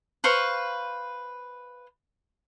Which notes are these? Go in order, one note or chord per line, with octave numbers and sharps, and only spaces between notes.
B4 C5 F5 C#6